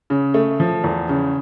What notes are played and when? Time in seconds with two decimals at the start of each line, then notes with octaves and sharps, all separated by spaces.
0.10 C#3
0.34 A3
0.60 F3
0.84 E2
1.09 C#3